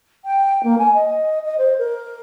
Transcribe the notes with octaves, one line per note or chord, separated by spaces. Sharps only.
G5
A#3
G#5
D#5
D#5
C5
A#4